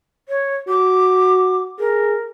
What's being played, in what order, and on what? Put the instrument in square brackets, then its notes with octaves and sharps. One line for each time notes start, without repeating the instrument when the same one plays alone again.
[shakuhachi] C#5
[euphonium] F#4 [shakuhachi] D6
[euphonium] G#4 [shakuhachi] A#4